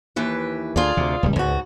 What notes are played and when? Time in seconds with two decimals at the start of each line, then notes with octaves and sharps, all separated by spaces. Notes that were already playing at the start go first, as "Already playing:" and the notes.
0.16 D#2 E3 B4
0.76 D2 F4 G#4 D5
0.97 D2 C3
1.23 D#1 C#2 G3
1.36 C#2 G#2 F#4